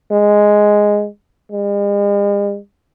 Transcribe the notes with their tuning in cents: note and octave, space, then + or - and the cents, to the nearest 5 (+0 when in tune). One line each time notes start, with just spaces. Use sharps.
G#3 +0
G#3 -45